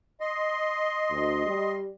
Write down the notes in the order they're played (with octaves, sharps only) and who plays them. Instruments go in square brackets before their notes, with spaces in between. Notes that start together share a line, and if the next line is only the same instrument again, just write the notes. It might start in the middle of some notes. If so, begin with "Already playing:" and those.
[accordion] D#5 C6
[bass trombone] D2
G3